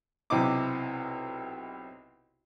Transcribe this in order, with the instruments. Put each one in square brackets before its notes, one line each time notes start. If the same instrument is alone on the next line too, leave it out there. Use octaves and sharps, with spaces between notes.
[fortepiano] B1 C3 C4 E4 D#5 D6